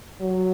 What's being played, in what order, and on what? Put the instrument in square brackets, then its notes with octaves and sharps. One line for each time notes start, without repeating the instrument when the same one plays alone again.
[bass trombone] F#3